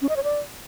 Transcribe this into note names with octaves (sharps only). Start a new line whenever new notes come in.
C#4
D#5
C#5
D5